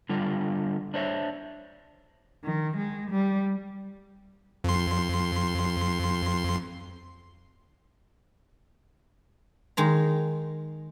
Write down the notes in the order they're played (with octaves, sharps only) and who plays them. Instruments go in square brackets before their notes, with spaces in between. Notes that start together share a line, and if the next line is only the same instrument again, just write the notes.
[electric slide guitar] D3 G3 F4
D4 C5 C#5 E5
[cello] D#3
G#3
G3
[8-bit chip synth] F2 C6
[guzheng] D#3 G#3 A#5